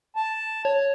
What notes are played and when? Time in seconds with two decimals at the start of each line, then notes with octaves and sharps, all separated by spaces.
0.16 A5
0.65 C#5